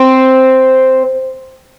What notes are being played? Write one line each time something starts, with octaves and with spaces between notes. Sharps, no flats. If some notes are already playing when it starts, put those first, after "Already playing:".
Already playing: C4